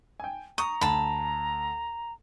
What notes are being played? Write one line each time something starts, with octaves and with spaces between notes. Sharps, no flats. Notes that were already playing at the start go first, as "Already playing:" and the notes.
G5 G#5
A#5 C#6 D#6
D2 A5 B5